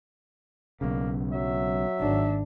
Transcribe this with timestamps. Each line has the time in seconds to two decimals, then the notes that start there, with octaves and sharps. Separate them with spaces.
0.81 B1 C#3 A#3
1.33 F#3 E5
2.00 G#1 D4